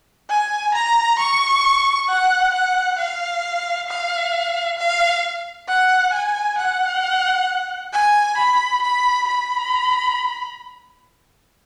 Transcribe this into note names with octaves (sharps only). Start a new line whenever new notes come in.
G#5
A#5
C#6
F#5
F#5
F5
F5
F5
F#5
G#5
F#5
G#5
B5
B5
B5